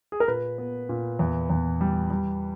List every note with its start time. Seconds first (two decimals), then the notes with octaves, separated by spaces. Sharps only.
0.12 G#4
0.20 A#4
0.28 A#2 B4
0.58 B3
0.89 A#2
1.19 E2
1.50 E2
1.81 G3
2.10 G3